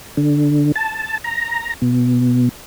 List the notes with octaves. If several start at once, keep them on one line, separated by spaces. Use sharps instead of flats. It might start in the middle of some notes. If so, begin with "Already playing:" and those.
D3
A5
A#5
B2